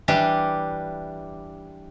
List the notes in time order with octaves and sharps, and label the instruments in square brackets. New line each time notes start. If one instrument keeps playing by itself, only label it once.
[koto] E3 G3 D4 G4